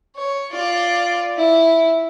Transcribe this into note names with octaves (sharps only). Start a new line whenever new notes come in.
C#5
F4 D5
E4